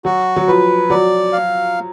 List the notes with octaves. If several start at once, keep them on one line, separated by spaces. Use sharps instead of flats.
F#3 F#4
F#3
F3 B4
F#3 D5
F5